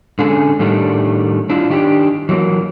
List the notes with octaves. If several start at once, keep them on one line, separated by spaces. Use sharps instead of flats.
D3 G#3 C#4 G#4 A4 G#5
A2 D#3 G3 A3 D4
D4 E4 F4
D#3 D4 G4
E3 F#3 G#3 A#3